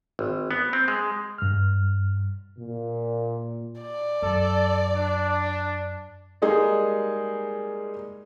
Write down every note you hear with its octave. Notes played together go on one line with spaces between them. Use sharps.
G#1
B3
C4
G#3
G2 F6
A#2
D5
F#2 A4
D4
G3 G#3 A#3 D#4 G#4